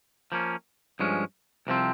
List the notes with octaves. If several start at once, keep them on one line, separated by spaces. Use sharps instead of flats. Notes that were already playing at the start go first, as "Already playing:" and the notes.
F3 A#3 C#4
G2 F3 G#3 C#4
C2 C3 F3 C4